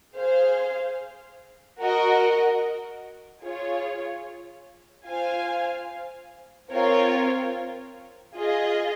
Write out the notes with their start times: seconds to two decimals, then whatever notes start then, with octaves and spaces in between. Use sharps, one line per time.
0.17 G#4 C5 F5
1.80 F#4 A#4 D#5
3.44 F4 G#4 C#5
5.08 F4 C5 F5 G#5
6.71 C4 F4 A#4 C#5
8.35 F4 G#4 D#5